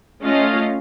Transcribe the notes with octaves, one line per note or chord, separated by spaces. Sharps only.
A3 C#4 F4 D#5 F5